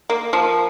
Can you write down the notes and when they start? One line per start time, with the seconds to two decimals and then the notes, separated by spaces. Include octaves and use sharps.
0.10 A#3
0.33 F3